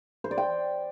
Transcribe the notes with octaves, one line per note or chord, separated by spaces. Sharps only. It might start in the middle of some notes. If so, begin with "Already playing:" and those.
C5
D5
G5